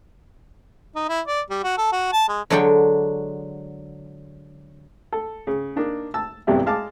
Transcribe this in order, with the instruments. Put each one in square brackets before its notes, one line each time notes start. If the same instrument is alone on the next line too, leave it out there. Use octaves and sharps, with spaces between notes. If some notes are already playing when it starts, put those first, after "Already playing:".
[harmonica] D#4
E4
D5
G3
F#4
A4
F#4
A5
G#3
[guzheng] D3 F#3 G#3 D4 F#5 G5
[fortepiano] A4
C#3
A#3 D4 D#4
A5 E6
B1 E2 G2 C3 E4
G#3 F5 A5 D6